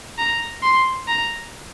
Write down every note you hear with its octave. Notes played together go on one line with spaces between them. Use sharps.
A#5
C6
A#5